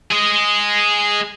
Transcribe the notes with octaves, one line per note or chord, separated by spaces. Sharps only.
G#4 D#5